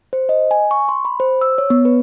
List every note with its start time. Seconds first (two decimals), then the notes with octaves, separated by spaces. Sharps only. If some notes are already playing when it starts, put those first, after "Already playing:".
0.13 C5
0.29 D#5
0.51 G#5
0.71 C#6
0.89 C6
1.05 B5
1.20 C5
1.41 E6
1.58 C#5
1.70 B3
1.85 B4